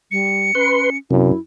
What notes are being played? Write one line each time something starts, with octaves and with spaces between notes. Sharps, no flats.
G3 C#7
C#4 B4 C6
F#2 C3 E4